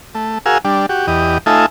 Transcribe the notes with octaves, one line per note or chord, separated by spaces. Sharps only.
A3
F#4 G#4 A#4 F5 G#5 E6
G3 D4
F#4 G4
E2 G4 D#5
A3 D#4 F4 A4 E5 G#5